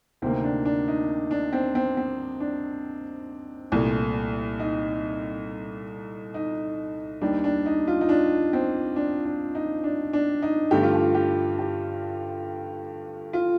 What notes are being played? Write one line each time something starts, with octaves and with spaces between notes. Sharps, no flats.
D2 C3 D#3 A#3 C4
D4
D4
D#4
D4
C4
C4
C4
D4
C2 A#2 A3
D#4
D#4
D#2 D#3 G3 D4
D4
D#4
F4
D#4
D4
C4
D4
D4
D#4
D4
D4
D#4
G2 D3 A3 G4
F4
G4
G4
G4
F4